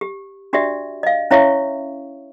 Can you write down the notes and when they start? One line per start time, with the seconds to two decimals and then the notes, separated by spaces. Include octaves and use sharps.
0.01 G4
0.53 D4 F#4 G4 D5 E5
1.03 D#5 F5
1.31 C#4 E4 C#5 E5 F5 C#6